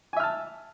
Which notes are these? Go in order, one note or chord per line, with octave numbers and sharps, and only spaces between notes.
E5 G#5 A5 F6